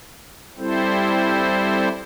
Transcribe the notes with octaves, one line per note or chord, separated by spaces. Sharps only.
G3 C4 E4 A4 C5